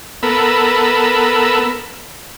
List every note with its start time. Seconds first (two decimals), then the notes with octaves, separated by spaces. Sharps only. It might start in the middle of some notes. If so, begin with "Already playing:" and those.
0.23 B3 A4 A#4 B5 E6